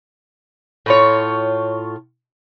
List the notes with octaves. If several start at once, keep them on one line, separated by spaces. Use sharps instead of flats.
A2 F4 C#5